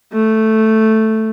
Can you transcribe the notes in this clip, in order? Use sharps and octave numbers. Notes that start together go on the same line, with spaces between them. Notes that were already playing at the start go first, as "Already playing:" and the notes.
A3